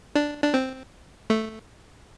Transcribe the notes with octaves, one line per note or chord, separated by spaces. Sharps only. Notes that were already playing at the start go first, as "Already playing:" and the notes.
D4
D4
C4
A3